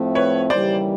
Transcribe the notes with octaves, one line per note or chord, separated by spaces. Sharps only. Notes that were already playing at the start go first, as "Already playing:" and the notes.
Already playing: A2 F3 A3 C4
B4 C#5
D#2 C#3 E3 G3 C5 D5